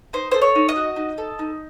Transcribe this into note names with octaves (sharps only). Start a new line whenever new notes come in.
D#4 C5
A4 C5
C#5
D#4
D#5
F#4
D#4
A4
D#4